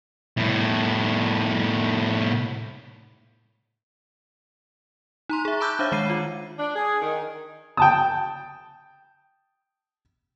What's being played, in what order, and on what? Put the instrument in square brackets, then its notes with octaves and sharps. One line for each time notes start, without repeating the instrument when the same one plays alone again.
[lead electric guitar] C2 A2
[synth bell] D#4 A#5 C6
G#4 E5
A5 B5 D6 E6 F#6 G6
D4 C5 C#5 E5 F5
D#3 G#3 C#5 D6 C7 D#7
F4
[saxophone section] D4
G#4
D#3
[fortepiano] G5 A5 D#6